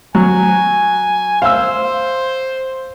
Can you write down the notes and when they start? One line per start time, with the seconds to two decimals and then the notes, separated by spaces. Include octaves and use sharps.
0.15 F#3 G#5
1.42 C5 F5 E6